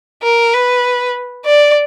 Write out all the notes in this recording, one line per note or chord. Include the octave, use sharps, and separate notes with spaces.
A#4
B4
D5